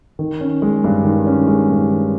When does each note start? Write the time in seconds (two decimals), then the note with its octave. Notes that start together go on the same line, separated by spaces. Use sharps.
0.19 D#3
0.41 C#4
0.62 G#3
0.84 G2
1.05 D#3
1.27 C#4
1.47 G#3
1.69 G2
1.90 D#3